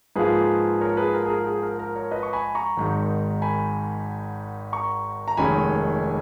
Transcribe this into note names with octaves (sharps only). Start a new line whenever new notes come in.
G#2 F3 A#3 F4 G#4 B4
A#4 C#5
G#4 B4
A#4
G#4
A#4
G#4
A#4
A#4
A#4 C#5
B4 D#5
C#6
G#5 B5
A#5 C#6
G#1 G#2 D#3
G#5 B5
A#5 C#6
A#5
F1 D#2 D#3 G#3 C#4 G#5 B5